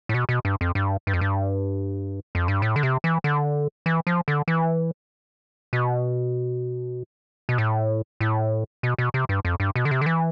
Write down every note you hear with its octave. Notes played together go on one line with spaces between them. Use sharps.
A2
B2
B2
G2
F2
G2
G2
F2
G2
F2
G2
A2
D3
C3
E3
D3
E3
F3
D3
E3
B2
B2
A2
A2
B2
B2
C3
G2
F2
G2
B2
D3
C3
D3
E3